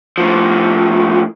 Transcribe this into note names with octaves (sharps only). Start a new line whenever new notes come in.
A2 F3